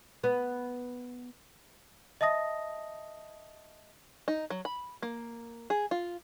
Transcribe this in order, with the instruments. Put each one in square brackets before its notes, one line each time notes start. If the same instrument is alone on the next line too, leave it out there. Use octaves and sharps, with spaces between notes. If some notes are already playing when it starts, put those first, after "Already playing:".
[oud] B3
[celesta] D#5 E5 A5 D#6 A#6
[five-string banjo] D#4
F#3
B5
A#3
G#4
F4